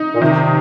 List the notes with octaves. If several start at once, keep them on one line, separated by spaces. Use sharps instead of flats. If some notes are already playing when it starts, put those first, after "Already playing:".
Already playing: D#4
A#2
C3 D#3